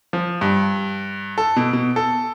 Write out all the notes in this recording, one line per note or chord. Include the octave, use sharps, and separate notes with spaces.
F3
G2
A4
B2
B2
A4